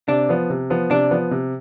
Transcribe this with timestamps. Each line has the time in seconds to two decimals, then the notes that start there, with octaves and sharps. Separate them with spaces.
0.08 C3 D4
0.29 F3 B3
0.50 C3
0.70 F3 B3
0.90 C3 D4
1.11 F3 B3
1.31 C3